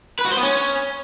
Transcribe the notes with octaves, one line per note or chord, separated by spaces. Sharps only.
B4
F#4
C5
B3
C#4